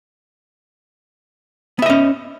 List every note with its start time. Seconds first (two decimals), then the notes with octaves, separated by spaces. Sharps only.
1.79 B3
1.82 E5
1.86 D#5
1.90 C#4